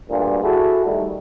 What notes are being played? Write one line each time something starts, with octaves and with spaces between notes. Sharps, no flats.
D2 G2 A#2
E4 F#4 G#4 A4
D#3 G3 A3